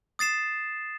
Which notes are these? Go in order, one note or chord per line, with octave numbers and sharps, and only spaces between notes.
D#6 A6 C7 E7